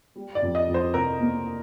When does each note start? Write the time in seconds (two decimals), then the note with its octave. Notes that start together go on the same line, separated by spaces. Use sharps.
0.16 G3
0.35 D5
0.42 F2
0.55 D#5
0.68 F2
0.74 C5
0.94 C2 A#4
1.20 A#3